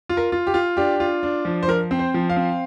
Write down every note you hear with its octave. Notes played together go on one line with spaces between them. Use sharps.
F4
A#4
F4
G4
F4
D4 G4
F4
D4
F3
C5
F3 A#4
C4
C5
F3
F5
C4